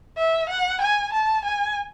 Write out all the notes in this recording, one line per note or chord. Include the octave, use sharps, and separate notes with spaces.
E5
F#5
G#5
A5
G#5